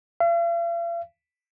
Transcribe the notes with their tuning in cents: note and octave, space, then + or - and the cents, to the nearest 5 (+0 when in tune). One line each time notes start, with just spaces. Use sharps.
F5 -45